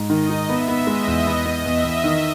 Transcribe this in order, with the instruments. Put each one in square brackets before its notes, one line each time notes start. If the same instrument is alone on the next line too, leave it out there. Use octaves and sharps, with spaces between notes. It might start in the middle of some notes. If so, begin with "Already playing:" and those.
Already playing: [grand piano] G#2
[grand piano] D#3 [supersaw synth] D#5
[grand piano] D#4
[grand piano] B3 [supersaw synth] E5
[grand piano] B3
[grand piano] G#3 [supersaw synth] D#5
[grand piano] E2
B3
B3
[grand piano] E2 [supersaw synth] E5
[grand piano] E2
D#3